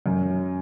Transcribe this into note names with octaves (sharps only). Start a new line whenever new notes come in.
F#2